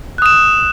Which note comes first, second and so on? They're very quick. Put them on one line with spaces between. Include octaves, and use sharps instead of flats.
F#6 D#6 E7